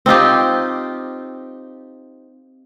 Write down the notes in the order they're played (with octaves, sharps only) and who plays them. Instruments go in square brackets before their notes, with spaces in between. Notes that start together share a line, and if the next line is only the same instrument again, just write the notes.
[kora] C4 D#4 F4 G4